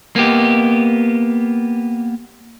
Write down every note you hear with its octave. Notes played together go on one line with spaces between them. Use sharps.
A#3 B3 G4